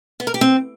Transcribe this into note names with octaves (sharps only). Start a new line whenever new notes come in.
B3
A#4
G4
C4